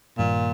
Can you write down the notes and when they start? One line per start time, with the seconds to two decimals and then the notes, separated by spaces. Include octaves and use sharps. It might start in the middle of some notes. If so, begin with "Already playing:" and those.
0.18 G2 A#2 D#3 G3 A#3